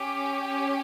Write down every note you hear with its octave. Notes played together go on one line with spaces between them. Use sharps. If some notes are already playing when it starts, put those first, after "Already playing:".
Already playing: C#4 G4